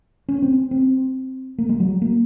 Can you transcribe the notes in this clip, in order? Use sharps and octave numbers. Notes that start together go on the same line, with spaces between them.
C#4
C4
C4
A#3
G#3
F#3
A#3